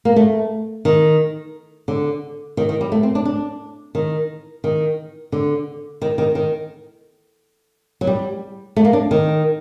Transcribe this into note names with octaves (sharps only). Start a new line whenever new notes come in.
A#3
A3
D#3
D3
D#3
D#3
G3
A3
C4
D4
D4
D#3
D#3
D3
D#3
D#3
D#3
F#3
G3
A3
A#3
D4
D#3